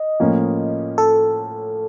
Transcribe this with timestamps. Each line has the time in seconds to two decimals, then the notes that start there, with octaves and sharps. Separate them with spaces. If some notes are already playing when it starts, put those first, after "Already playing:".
Already playing: D#5
0.20 A2 F3 A#3 C#4
0.98 A4